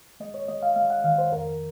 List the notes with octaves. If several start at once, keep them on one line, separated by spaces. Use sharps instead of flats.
G#3 D#5
C#5
G#3 D#5
F5
G#3 F5
F#5
D#3 F5
C5
F2 A#4